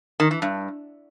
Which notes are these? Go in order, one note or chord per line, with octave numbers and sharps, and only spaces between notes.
D#3
E3
G2